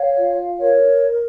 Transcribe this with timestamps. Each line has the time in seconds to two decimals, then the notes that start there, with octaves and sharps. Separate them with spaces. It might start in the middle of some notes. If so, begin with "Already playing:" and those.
Already playing: C#5 F5
0.18 F4
0.59 A#4 C#5